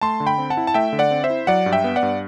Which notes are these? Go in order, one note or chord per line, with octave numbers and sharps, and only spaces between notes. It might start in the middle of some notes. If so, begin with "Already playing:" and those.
A3 A5 C6
D3
G5 B5
C4
F#5 A5
E4
A5
A3 E5 G5
D3
D5 F#5
C4
C5 E5
E4
F#3 D5 F#5
G2
E5 G5
B3
D5 F#5
G2